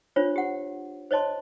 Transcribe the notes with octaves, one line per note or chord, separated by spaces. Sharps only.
D4 F4 C5 C#5
G4 F#5
C5 C#5 D#5 A5 C6